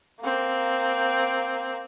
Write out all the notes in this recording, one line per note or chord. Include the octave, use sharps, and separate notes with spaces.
A#3 C4